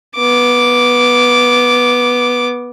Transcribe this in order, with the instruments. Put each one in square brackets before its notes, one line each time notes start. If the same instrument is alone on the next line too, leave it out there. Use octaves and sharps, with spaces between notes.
[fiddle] B3 D6